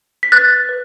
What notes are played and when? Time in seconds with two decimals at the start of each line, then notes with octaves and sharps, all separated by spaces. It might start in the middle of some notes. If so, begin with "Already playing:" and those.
0.23 B6
0.32 B4 F#6 A6
0.69 B4